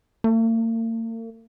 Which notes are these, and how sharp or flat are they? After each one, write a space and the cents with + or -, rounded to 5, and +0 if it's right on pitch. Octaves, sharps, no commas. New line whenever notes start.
A#3 -45